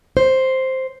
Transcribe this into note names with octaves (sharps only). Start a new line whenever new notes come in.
C5